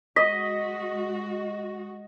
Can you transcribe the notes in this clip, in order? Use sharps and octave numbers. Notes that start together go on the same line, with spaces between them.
G#3 F#4 D#5 B6